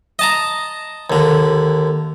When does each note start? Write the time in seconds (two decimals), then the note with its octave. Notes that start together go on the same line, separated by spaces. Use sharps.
0.19 D#5 A5 A#5
1.10 D#2 D3